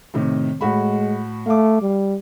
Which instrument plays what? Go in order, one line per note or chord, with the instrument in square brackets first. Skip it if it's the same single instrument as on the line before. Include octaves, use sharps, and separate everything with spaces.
[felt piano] A2 C3 D#3
[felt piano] A2 F#4 B5 [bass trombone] G#3
[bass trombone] A3 [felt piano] F5 D6
[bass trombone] G3